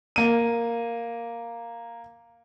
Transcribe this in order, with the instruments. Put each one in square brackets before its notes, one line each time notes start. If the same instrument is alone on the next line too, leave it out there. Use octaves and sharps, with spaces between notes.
[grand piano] A#3 D#7